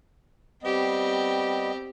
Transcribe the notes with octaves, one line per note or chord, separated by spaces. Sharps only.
G3 B3 C4 G4 D#5